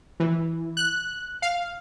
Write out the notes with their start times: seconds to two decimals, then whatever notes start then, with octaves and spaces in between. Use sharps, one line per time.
0.20 E3
0.77 F#6
1.42 F5